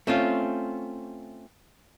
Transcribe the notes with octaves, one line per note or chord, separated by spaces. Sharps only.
A3 C4 C#4 F4